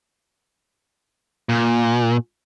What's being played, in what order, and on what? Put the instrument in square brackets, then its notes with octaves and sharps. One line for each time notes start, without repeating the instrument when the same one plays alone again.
[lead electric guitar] A#2